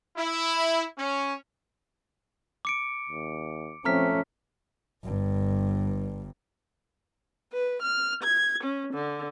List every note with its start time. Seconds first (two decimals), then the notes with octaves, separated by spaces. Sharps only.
0.17 E4
0.98 C#4
2.65 D6 C#7 D7
3.09 D#2
3.85 F3 A3 C4 C#4 A#5 F6 B6
5.05 G1 G2
7.53 B4
7.83 F6
8.23 G#6
8.64 C#4
8.94 D3